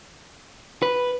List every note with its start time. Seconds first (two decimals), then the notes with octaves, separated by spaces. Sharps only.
0.82 B4